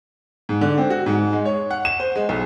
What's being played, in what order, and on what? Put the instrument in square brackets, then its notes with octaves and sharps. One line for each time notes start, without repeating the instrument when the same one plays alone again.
[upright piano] G#2
D3
C4
F#4
G#2
G#3
C#5
F#5
E7
C5
G#3
B1